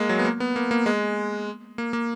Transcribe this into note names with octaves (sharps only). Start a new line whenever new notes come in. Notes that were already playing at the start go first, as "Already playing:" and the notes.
Already playing: G#3 A#3
F#3
B3
A#3
B3
A#3
A#3
G#3
A#3
A#3